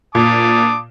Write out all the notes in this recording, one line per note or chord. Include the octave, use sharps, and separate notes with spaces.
A#2 A5 D6 D#6